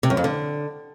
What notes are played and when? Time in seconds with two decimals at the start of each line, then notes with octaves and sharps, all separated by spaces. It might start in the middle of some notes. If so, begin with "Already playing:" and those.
0.03 C3
0.10 F#2
0.17 F2
0.24 D3